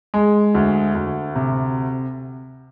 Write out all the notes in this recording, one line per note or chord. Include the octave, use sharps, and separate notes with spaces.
G#3
D2
D2
C3